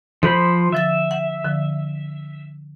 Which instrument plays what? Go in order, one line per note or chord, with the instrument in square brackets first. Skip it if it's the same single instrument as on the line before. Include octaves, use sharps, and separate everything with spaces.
[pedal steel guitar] F3 C5 B5 [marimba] A4
[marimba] D3 F3 A6 [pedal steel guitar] E5
[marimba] F#5
D3 F3